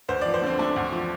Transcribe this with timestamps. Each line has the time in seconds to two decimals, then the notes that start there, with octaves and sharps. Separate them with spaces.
0.09 D2 C5
0.21 F3 D5
0.34 C5
0.42 D3 C4
0.59 A3 D4
0.76 D2
0.92 F3